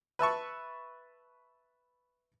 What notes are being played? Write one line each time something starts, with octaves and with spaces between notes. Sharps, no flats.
B4 E5 A5 C#6